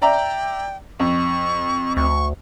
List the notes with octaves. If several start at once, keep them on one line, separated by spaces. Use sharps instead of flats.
D5 E5 G5 A#5
F2 C#6
D2 C#6